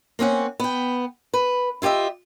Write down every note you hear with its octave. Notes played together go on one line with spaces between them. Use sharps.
A#3 C4 C#4 F#5
B3 G5
B4
E4 F4 G4 D#5 E5